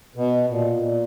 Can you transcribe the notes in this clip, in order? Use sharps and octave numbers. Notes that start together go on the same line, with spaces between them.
B2
A#2
A#2